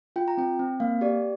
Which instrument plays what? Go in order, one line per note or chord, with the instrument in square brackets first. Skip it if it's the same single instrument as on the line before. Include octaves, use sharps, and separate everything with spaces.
[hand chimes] F4 G5
A#5
C4 G5
C4
A#3 F5
G4 D5